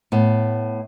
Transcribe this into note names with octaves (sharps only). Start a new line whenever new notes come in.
A2 B3